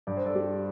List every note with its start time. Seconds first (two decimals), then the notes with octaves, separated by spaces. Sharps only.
0.07 G2 D5
0.17 C5
0.26 A4 D5
0.35 G3